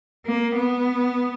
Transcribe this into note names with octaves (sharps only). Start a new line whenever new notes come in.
A#3
B3